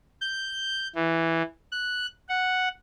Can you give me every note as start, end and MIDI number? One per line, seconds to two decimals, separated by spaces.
0.21 0.88 91
0.95 1.42 52
1.72 2.07 90
2.29 2.68 78